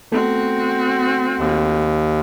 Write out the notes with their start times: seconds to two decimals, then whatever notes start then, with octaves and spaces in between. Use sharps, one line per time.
0.12 A3 B3 C4 F#4 A4
1.39 D#2